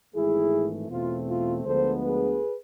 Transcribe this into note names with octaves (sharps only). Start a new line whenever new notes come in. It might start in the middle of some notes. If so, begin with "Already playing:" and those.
G#1 G#2 E3 A3 E4 G#4
E2 B2 A3 C4 F4
F4
D2 D3 F3 G#3 B3 A4 C5
G#4 B4